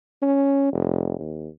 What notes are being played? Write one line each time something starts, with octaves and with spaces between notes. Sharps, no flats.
C#4
F1
D#2